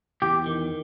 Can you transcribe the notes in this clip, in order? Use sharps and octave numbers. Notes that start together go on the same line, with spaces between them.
E2 G4
D#3